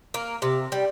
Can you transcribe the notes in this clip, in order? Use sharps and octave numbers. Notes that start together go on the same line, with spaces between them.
A#3
C3
G3